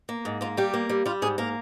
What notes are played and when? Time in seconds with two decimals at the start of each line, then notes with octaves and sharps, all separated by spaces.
0.09 A#3
0.25 G#2
0.41 A#3 F4
0.57 G3 G4
0.74 A#3
0.89 G3
1.06 G3 F4
1.22 G#2 G#4
1.38 A#3 A#4